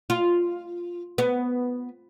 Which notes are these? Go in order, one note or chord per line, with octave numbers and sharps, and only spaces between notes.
F4
B3